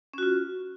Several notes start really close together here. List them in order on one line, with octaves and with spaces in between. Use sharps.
C#4 F#4 F4